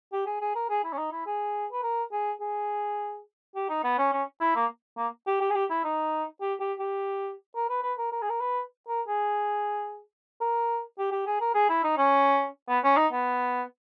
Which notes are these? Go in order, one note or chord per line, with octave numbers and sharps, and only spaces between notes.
G4
G#4
G#4
A#4
G#4
E4
C#4
D#4
E4
G#4
B4
A#4
G#4
G#4
G4
D#4
B3
C#4
C#4
E4
A#3
A#3
G4
G4
G#4
G4
E4
D#4
G4
G4
G4
A#4
B4
B4
A#4
A#4
G#4
A#4
B4
A#4
G#4
A#4
G4
G4
G#4
A#4
G#4
E4
D#4
C#4
B3
C#4
D#4
B3